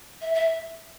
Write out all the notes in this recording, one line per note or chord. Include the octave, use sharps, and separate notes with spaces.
E5
E5